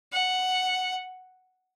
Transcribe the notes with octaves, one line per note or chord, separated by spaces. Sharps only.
F#5